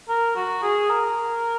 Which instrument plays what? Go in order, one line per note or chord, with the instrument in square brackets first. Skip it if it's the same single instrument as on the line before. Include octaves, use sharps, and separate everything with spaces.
[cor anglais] A#4
F#4
G#4
A#4